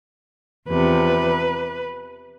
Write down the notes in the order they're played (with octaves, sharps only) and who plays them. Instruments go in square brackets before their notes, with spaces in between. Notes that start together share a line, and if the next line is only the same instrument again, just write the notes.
[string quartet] E2 C3 F3 B4